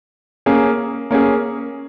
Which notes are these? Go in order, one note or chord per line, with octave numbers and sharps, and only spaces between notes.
A#3 C#4 G#4
A#3 C#4 G#4